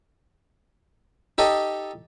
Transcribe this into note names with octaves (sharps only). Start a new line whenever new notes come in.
D#4 G4 A4 D#5